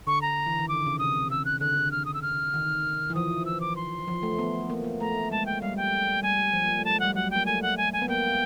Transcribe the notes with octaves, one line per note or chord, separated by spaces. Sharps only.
D3 C#6
A#5
E3
D#3
D3 D6
C#3
C3 D#6
C#3 E6
F#6
D3 F#6
D3
F6
D#6
E6
F6
D#3
E3
F3 D#6
E6
D6
C6
F3
A3
B3
A#3
A#3
A3 A#5
G#3 A5
G5
G3 F5
G5
G3 G#5
F3
A#3
A3
A5
G#3
G3 F#5
F#3 F#5
A#3 G5
A3 G#5
F#5
G#5
G#5
B3
A#3 G5